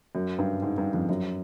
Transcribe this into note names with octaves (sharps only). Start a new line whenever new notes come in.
F#2
G2
G#2
G2
F2
F#2